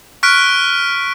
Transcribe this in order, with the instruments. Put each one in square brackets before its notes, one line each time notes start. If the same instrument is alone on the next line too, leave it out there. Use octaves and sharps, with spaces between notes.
[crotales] C#6 F6 F#6 B6 D7